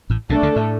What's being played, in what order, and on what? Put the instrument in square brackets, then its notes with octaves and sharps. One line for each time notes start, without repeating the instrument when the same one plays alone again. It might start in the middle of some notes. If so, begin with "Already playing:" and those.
[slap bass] A1 A2
[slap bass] B1 B2 [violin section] A3 D4 A4
[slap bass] D2 D3
A2